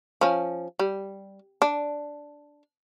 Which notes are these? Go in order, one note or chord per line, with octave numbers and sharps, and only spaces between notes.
F3 C#4
G3
D4